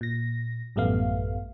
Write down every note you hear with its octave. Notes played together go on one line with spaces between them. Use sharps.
A#2 A#6
A1 F#2 G3 A3 B3 F5